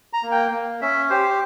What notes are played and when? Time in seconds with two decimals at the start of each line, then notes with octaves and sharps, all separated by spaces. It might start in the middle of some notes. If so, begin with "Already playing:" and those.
0.13 A#5
0.23 A#3
0.32 G5
0.51 A#3
0.81 C#4 E5
1.10 G4 C5